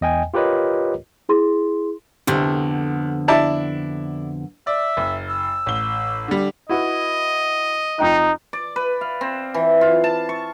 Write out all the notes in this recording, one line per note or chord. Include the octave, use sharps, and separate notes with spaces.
E2 D#5 G5 G#5
F4 G4 A#4 B4 C#5 D#5
E4 G#4 C6
C2 F2 B2 D3
D4 E4 A5
D5 E5
F#1
E6
A1 G7
D3 G3
E4 F#4 B4 D#5
F2 D#4 G5 F#6
D5
B4
F5
C4
E3
F4
A5
C#6